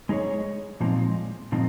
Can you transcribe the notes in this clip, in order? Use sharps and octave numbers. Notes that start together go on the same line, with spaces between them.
G#3 D#4 G#4 C#5
A#2 F3 G#3 C4 D#4
A#2 F3 G#3 C4 D#4